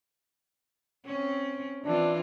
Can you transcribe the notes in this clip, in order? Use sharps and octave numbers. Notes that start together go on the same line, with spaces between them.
C4 C#4
E3 C4 D4 F4